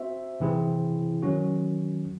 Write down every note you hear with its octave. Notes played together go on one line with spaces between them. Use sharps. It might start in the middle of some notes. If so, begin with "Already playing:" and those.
Already playing: C4 F#4 C5 E5
C3 E3 C4 E4 G#4
D#3 F#3 C#4 F#4